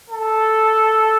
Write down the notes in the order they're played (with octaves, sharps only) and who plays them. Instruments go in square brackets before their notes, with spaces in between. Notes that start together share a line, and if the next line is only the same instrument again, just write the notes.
[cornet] A4